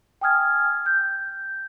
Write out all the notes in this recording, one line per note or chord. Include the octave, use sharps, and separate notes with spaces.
G5 G#5 D#6 F6 G#6
G6